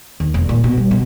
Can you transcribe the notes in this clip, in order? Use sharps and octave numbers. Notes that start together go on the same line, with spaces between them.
D#2
E1
A#2
B2
G3
B2